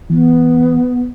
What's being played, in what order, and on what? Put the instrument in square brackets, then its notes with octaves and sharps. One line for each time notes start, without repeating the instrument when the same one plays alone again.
[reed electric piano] E3 [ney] B3